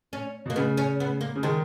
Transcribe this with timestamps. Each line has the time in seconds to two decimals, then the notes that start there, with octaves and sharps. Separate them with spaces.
0.13 C#4
0.46 B2 A#3
0.56 C#3 B3
0.77 C#4
1.00 B3
1.21 A#3
1.35 C#3
1.43 D#3 G#3